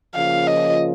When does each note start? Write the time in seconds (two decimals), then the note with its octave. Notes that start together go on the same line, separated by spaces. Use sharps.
0.15 C#3 F3 A#3 F4 F5
0.47 D#5